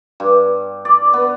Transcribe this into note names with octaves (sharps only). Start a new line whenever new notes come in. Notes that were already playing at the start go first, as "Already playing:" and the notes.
G2
D5
B3